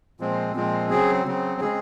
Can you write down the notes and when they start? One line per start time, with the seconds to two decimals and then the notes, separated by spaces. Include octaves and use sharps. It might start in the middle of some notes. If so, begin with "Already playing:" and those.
0.20 A#2 F3 G#3 C4
0.55 A#2 F3 G#3 C4
0.90 C#3 F#3 C4 G#4
1.26 C#3 F#3 C4
1.61 C#3 G#3 C4 G#4